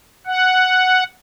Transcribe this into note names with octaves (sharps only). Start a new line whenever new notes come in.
F#5